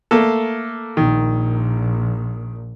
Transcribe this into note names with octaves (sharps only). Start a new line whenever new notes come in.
A3 A#3 A4
A#1 A#2 D#3